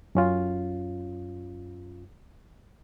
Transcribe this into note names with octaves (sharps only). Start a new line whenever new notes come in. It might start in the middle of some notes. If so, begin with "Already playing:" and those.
F#2 C#4 F4